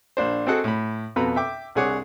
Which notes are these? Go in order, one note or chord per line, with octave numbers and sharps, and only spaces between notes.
A#1 D4 C5
C4 F#4 G#4 A4 D#5 F#5
A2 B5
F2 B2 A4 B4 A#5 B5
E5 G5 D6
C2 D4 G#4 C#5 F#5 D6